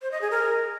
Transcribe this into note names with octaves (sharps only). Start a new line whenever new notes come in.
C5
D#5
G#4
A#4